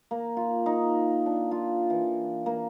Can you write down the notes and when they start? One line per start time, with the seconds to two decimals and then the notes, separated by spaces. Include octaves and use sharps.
0.11 A#3
0.37 F4
0.66 D#4
1.26 D4
1.51 F4
1.90 E3
2.46 A#3